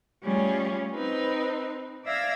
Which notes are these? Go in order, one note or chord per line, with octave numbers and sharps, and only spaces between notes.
G3 A3 C#4 F4 G#4 C#5
C4 D#4 B4
D5 E5 F5 E6 G#6 A#6